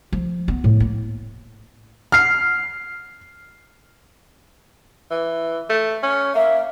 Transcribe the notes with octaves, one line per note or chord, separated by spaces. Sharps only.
F3
B3
A2
A#3
F6 C7
E3
A3
C#4
A#3 E5